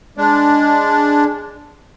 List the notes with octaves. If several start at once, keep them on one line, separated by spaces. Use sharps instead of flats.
G#3 D4